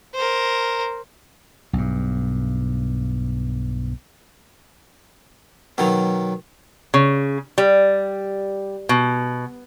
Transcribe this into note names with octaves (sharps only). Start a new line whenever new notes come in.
A#4 C5
B1 G2
B2 D#3 F#3
C#3
G3
B2